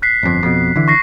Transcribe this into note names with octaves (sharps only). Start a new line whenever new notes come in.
F#6 B6 C7
G1 F2
F2 B2
D3 E3
C#6 A#6 C7